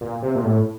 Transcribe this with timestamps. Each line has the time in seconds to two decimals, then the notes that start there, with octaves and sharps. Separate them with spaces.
0.01 A#2
0.22 C3
0.35 A#2
0.44 A2